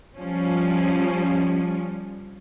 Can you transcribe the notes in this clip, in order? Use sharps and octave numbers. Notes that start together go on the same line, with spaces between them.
F3 G3 C#4